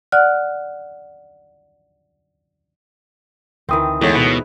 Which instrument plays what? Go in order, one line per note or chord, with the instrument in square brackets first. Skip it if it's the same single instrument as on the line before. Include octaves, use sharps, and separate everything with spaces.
[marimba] D5 F#5 F6 F#6
[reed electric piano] D2 D#6 [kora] D#3 E3 C4
[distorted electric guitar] E2 [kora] G#2 [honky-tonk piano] E3 A3 C#5
[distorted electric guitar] B2 [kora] E4 B4